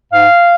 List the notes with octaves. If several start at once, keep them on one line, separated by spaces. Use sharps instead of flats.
G#2 F5